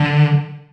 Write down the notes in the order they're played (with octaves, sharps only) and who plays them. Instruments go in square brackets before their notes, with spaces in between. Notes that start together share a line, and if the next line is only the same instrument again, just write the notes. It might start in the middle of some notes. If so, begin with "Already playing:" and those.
Already playing: [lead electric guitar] D3